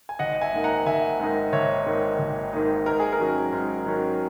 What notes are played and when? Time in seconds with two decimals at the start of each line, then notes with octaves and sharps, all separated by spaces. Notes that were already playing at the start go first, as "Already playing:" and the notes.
0.09 G#5
0.19 G#1 D#5 F#5
0.41 E5 G#5
0.53 G#2 D#3 A#3 D#4
0.64 F#5 A#5
0.86 G#1 E5 G#5
1.20 G#2 D#3 A#3 D#4
1.53 G#1 C#5 E5
1.86 G#2 D#3 A#3 D#4
2.19 G#1
2.53 G#2 D#3 A#3 D#4
2.86 G#2 A#4
2.99 G#4
3.13 A#4
3.19 D#3 F#3 C#4
3.53 G#2
3.86 D#3 F#3 C#4